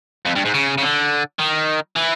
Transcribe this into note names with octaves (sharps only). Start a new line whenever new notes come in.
F2
G2
G#2
C#3
C#3
D3
D#3
E3